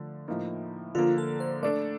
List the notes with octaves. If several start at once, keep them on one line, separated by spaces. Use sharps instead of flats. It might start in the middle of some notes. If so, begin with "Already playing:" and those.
Already playing: D3 F3 A3
A2 F3 A#3 D#4
D3 F3 A#3 F4
A4
C5
A3 D4 A4 D5